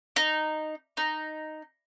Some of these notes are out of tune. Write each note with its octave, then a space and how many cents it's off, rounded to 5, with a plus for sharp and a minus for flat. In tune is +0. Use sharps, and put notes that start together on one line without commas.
D#4 -10
D#4 -5